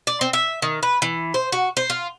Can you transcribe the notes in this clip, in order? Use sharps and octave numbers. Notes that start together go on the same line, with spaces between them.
D5
C4
E5
D#3
B4
E3
C5
F#4
C5
F4